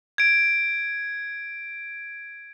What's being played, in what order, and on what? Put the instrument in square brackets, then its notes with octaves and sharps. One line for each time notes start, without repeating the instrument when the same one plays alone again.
[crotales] G#6 D7